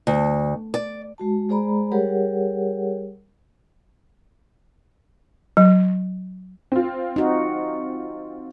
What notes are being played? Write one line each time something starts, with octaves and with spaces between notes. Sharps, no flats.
D2
D5
G#3 F#4 A5
G#3 G#4 C5 D5 A#5 B5
G3 G4 G#4 A#4 C#5 F#5
F#3
C4 F4
D#4 F#4